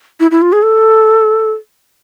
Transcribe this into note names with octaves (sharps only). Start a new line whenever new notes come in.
E4
E4
F4
G#4
A4